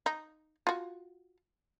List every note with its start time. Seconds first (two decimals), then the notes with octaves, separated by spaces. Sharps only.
0.06 D#4
0.67 F4 F#4